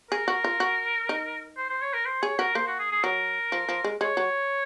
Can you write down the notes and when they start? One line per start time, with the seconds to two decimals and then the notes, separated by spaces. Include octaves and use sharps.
0.11 G#4 A#4
0.28 F#4
0.44 F4
0.60 F#4
1.09 D#4
1.58 C5
1.70 C5
1.82 C#5
1.94 A#4
2.06 C5
2.22 G#4 C#5
2.39 F#4 A#4
2.55 A#3 C5
2.67 F#4
2.79 G#4
2.92 G#4
3.04 F#3 A#4
3.52 F3
3.69 F3
3.84 G#3
4.01 G#3 C#5
4.17 F#3